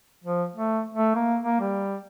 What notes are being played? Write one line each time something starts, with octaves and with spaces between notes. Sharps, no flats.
F3
A3
A3
A#3
A#3
G3